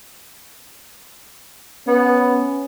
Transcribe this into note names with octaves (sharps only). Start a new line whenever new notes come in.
B3 C#4